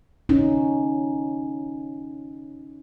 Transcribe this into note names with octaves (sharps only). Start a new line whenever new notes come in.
C#4 D#4